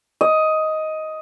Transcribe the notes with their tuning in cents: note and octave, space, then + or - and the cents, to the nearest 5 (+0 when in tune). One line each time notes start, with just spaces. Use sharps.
D#5 +10